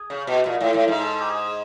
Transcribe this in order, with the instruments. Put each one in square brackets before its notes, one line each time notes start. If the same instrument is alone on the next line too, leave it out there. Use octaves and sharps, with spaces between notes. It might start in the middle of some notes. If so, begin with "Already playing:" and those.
Already playing: [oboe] G#4
[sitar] C#3
B2
A#2
A2
A2
G#2
[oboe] A4
G4
G#4